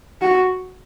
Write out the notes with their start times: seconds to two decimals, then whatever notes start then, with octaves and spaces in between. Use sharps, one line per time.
0.21 F#4